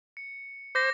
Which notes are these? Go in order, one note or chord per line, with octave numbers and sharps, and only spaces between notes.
C#7
C5 D6 A#6